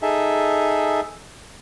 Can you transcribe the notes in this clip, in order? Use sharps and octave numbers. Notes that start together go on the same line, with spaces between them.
D#4 G#4 A4 E5